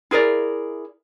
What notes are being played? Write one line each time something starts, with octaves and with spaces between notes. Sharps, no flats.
E4 G#4 A#4 D5